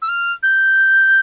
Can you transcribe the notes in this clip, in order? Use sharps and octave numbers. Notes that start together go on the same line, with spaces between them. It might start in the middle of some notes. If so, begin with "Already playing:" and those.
E6
F6
G6